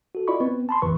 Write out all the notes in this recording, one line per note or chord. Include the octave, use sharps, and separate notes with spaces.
F#4 A4
E4 F4 D5 D#5 B5 C#6
B3 C4 B4
A5 B5 C6
A1 E2 D#3 E3 B4 C#6